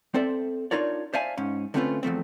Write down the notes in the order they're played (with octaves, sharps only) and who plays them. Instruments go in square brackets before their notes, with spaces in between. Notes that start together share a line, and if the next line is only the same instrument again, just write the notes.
[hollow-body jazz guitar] C4 A4 C5 D5 E5
D4 D#4 F4 A#4 C#5 D5
C5 D5 E5 F5 G#5 A5
G#2 C#4
D3 A3 C4 C#4 F4 B4
E2 F3 A3 C4